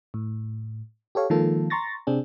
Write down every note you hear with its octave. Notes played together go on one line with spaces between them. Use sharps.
A2
G4 A4 C#5 F5
D#3 F3 G#3 A#3 F4 A4
A#5 C6 C#6 A6 A#6
C3 C4 D4 G#4